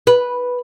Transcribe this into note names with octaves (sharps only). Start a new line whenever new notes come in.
B4